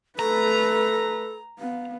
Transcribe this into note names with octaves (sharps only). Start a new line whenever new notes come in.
A3 A4 B4 A#5
B3 F5